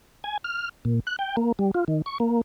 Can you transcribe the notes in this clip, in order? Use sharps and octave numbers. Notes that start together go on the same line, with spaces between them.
G#5
F6
A#2
F#6
G5
A#3
G3
F4
D#3
C#6
A#3